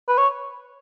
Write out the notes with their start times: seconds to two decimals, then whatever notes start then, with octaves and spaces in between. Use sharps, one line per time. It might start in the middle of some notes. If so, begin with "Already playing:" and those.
0.08 B4
0.18 C#5